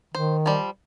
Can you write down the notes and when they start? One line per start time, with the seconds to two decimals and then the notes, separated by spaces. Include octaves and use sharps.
0.15 D#3 C5
0.46 F3 G3